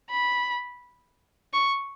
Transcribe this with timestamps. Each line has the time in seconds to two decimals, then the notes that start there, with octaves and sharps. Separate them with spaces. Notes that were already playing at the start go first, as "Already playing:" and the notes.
0.10 B5
1.53 C#6